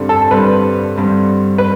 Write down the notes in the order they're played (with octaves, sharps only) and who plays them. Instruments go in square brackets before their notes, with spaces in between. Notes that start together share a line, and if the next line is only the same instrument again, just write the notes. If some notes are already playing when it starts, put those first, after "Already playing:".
Already playing: [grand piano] G2 D3 G3 C4
[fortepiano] A4
[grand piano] G2 D3 G3 C4 [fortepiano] B4
[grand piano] G2 D3 G3 C4
[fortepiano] B4